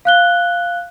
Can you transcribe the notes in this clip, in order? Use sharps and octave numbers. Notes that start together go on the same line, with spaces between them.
F5 F#6 G7